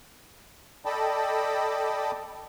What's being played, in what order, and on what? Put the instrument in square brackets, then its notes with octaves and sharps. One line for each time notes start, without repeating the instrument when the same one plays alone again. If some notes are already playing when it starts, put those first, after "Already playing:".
[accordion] A4 D5 D#5 G5 A5 B5